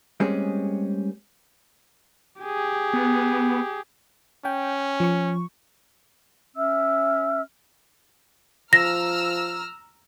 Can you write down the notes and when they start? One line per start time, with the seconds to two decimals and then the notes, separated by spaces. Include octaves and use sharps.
0.20 G3 G#3 A#3 C4 C#4 G#4
2.42 G4 G#4
2.93 B3
4.45 C#4 G5
5.00 F3 C#6
6.56 C#4 E5 E6 F6
8.73 F3 A#5 E6 F6 A#6